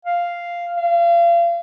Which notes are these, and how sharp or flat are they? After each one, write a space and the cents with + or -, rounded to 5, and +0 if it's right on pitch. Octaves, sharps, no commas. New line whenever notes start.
F5 -5
F5 -35